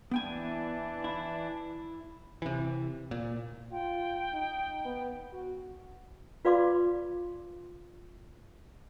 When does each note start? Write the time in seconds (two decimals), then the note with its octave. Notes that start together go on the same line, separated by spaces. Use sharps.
0.11 E3 B3 D4 G5 G#5
1.04 E4
2.42 C3 E3
3.11 A#2
3.72 F4 G5
4.34 D#4
4.85 B3
5.33 F#4
6.45 F4 B4 D5 F5 C6 D6